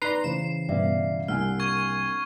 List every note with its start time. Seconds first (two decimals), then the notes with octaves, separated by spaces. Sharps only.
0.02 D#4 B4 D5 A#5 C6 C7
0.24 C#3 E3 C5 E7
0.69 G2 B2 D5 E5 F5
1.28 C2 A#3 D4 F#5 G#5 F6
1.60 C#6 G#6